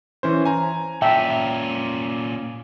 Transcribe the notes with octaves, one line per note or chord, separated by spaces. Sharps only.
E3 C#4 C5
G#5 A#5
A#2 C#4 E5 G5 A5